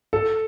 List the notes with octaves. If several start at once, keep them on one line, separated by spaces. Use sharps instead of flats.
A4